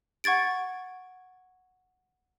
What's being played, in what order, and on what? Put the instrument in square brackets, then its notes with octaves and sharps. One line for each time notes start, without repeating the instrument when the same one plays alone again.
[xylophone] F#5 C#6 G#6 A6 D7